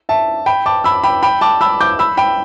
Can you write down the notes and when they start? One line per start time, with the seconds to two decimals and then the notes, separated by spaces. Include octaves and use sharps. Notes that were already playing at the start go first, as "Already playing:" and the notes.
0.09 E5 A5
0.46 G5 B5
0.66 A5 D6
0.84 B5 E6
1.04 G5 B5
1.23 G5 B5
1.41 A5 D6
1.61 B5 E6
1.81 D6 G6
1.99 B5 E6
2.17 G5 B5